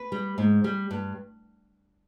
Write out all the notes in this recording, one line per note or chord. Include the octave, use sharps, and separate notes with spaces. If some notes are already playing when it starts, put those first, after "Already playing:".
Already playing: B4
G3
G#2
G3
G2